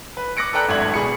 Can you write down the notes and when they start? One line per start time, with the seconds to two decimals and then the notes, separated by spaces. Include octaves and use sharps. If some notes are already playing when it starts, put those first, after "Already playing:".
0.17 B4
0.37 D6 F#6 A#6 C#7 D7
0.53 A4 B4 D5 G5 A#5 F#6
0.68 D1 G#1 A3 D4 G#6 F#7
0.94 B2 G#4 B5 C#7